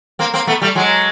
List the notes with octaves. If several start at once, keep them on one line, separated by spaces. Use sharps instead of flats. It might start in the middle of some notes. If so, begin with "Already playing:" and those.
A#3 C4
A#3 C4
A3 B3
G3 A3
F#3 G#3